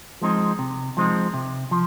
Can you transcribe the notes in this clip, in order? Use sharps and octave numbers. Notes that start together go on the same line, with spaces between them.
F3 G#3 C4 D#4
C3
F3 G#3 C4 D#4
C3
F3